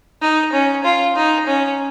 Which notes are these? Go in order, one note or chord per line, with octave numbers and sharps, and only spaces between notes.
D#4
C#4
F4
D#4
C#4